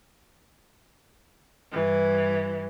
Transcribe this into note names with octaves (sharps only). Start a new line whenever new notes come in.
G2 E3